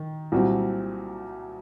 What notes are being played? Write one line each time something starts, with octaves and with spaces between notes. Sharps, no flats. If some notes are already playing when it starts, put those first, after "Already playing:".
Already playing: D#3
C2 A#2 F#3 C4 F#4